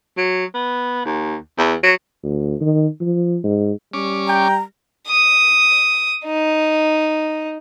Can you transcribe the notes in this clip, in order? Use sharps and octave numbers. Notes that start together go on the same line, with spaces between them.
F#3
B3
D#2
E2
F#3
D2
D#3
F3
G#2
G3 C#4 D6
G5 A#5
D#6
D#4